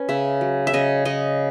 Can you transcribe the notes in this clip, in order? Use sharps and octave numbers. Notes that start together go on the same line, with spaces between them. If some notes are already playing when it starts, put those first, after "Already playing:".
Already playing: C#4 B4
C#3 E5
F#3
E5
C#3 D#5
C#3 D#5